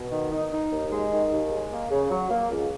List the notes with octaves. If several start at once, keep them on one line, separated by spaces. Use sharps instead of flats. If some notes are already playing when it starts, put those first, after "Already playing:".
Already playing: B2
D#3
D#4
D#4
D#2
G#3
D#3
D#2
G#3
A#3
C#3
F#3
A#3
C#2